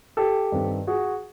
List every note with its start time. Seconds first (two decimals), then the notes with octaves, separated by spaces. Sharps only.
0.17 G4 A4
0.52 G2 D#3 G3 C4
0.87 F#4 G#4